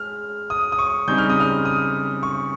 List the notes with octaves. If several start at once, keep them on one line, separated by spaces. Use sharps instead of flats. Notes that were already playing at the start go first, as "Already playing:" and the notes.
Already playing: G#3 F6
D#6
D#6
C#6
C#3 G3 C4 D#4 G6
F6
D#6
F6
D#6
C#6